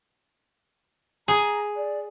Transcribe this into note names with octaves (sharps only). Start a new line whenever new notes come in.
G#4 A#5
D5